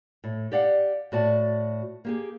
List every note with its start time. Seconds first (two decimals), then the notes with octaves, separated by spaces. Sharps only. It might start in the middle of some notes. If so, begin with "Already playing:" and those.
0.24 A2
0.52 G4 D5 F5 F#5
1.12 A2 F#4 D5 A5
2.05 A#3 G4 G#4